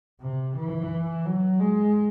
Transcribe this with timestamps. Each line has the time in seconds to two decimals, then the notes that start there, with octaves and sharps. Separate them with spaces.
0.20 C3
0.56 E3
1.25 F#3
1.60 G#3